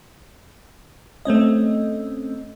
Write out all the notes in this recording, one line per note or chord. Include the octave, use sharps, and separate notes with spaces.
A3 C4 C#4 D#5